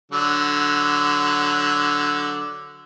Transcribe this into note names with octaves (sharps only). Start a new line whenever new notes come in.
D3 F#3